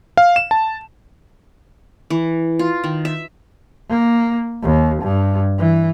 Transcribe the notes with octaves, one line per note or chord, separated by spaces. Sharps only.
F5
E7
A5
E3
F4
D#3
E5
A#3
D#2
G2
E3